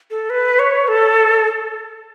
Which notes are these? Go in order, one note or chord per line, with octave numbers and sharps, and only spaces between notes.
A4
B4
C#5
A4